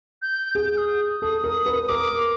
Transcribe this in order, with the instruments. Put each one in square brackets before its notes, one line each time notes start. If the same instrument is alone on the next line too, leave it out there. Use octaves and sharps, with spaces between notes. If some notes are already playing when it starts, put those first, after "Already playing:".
[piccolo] G6
[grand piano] G#4 [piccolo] G6
[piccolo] D#6
[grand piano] A4 [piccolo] D#6
[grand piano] A#4
B4
[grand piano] A#4 [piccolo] D6